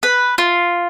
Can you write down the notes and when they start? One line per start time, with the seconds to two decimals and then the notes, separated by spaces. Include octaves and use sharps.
0.03 B4
0.38 F4